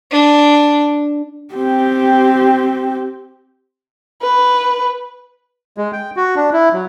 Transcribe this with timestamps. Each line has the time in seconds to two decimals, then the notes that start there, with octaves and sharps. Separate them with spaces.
0.12 D4
1.54 C4 G4
4.22 B4
5.78 G#3
5.93 G5
6.16 F#4
6.36 D4
6.53 E4
6.73 F#3